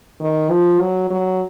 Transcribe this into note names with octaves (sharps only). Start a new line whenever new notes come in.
D#3
F3
F#3
F#3